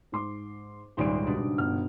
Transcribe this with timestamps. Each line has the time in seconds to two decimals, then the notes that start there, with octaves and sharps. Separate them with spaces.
0.12 G#2 C6 D6
0.97 D#1 C#2 G#2 G3 C6 D7
1.27 B2 D4
1.58 G1 F6